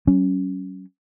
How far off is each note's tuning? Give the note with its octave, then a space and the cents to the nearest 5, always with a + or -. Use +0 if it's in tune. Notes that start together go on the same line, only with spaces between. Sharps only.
F#3 +35 C#4 +0